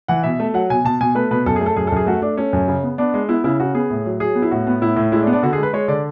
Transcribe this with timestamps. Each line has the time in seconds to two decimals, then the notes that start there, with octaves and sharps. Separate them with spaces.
0.08 E3 F#5
0.23 B2 E5
0.40 A3
0.54 F#3 F#5
0.70 B2 G#5
0.84 B2 A5
1.01 B2 G#5
1.15 A3 B4
1.31 B2 B4
1.46 F#2 A4
1.56 G#4
1.61 A3 A4
1.76 F#2 G#4
1.87 A4
1.92 F#2 G#4
2.06 A3 F#4
2.22 A3 D4
2.37 A3 C#4
2.53 F#2
2.68 C#3
2.83 B3
2.98 B3 D4
3.14 G#3
3.29 B3 E4
3.44 C#3 E4
3.60 C#3 F#4
3.75 B3 G#4
3.90 A2
4.06 F#3
4.20 F#3 G#4
4.35 B3
4.42 E4
4.51 A2 F#4
4.67 B3
4.81 A2 E4
4.96 A2
5.12 G#3 E4
5.23 D4
5.27 B3
5.33 D4
5.43 D3 F#4
5.53 G#4
5.58 G#3 B4
5.73 G#3 C#5
5.88 D3 D5